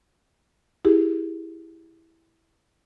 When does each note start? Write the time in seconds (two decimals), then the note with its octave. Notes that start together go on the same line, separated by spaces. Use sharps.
0.85 E4 G4 G#4